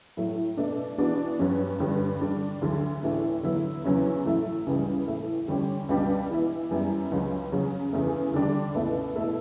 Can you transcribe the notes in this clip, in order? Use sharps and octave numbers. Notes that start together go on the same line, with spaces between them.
A2 F#3 A3
B2 A3 D4
E3 B3 D4 F#4
G2 F#3 C#4
G2 D3 G3 C#4
D3 G3 D4
D2 D3 F#3
A2 E3 A3 D4
D3 F#3 B3 E4
E2 C#3 F#3 C#4 E4
A2 F#3 A3 E4
C#2 C#3 E3 G3
A2 E3 A3
D3 G3 C#4 G4
C#2 B2 G3 D4 G4
E3 B3 E4
F#2 E3 G3 B3 E4
C#2 C#3 F#3 C#4
C#3 F#3 C#4
E2 C#3 E3 A3
D3 G3 D4 G4
C#2 B2 A3 E4
B2 A3 E4 A4